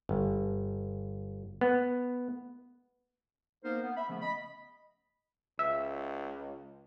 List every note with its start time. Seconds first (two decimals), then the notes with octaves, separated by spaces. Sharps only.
0.09 G1
1.61 B3
3.63 A#3 B3 D#4 A#4 C5
3.82 B3
3.96 E5 B5
4.08 C#3 F3 A3 B3 C#4
4.21 D#5 B5
5.59 C#2 E5